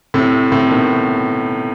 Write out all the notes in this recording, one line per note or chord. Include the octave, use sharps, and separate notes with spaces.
A2 C3
A2 C3
B2 D#3